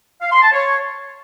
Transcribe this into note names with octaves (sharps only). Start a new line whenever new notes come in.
F5
C6
A5
C#5